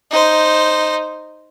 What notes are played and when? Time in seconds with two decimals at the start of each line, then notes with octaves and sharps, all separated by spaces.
0.11 D#4 C5